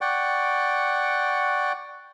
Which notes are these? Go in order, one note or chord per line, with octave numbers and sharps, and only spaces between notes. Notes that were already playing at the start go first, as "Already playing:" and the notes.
D5 F#5 G5 C#6